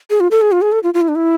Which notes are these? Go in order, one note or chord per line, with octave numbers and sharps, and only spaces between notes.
G#4
F4
A4
G#4
F4
G#4
A4
F4
F4
E4
D4
E4